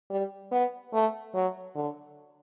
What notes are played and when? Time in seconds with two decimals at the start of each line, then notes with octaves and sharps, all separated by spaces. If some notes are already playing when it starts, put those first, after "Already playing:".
0.10 G3
0.52 B3
0.93 A3
1.34 F#3
1.75 D3